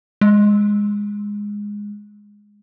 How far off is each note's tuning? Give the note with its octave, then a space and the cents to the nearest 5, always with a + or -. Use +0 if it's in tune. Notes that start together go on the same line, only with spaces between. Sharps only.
G#3 -10